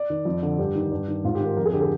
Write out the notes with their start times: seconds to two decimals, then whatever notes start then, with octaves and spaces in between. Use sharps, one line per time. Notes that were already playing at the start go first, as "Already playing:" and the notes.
Already playing: D5
0.10 D#3
0.25 F2
0.42 D3
0.58 G2 G4
0.75 D#3
0.91 G2
1.08 D#3
1.24 G#2 F4
1.35 G4
1.40 D#3
1.45 A#4
1.56 F2 A#4
1.65 G#4
1.73 D3 G4
1.81 G#4